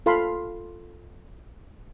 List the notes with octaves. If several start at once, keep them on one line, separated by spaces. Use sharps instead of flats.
F4 A4 F5 B5 C6